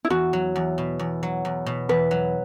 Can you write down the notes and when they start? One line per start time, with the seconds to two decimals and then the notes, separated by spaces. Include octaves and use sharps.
0.05 E4
0.10 E2 F#4
0.33 F#3
0.56 E2
0.78 B2
0.99 E2
1.23 F#3
1.45 E2
1.66 B2
1.89 E2 B4
2.11 F#3